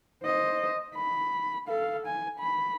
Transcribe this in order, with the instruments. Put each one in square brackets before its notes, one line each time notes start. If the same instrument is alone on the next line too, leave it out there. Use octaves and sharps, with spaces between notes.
[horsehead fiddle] C5 D#5
B5
A4 F5
G#5
B5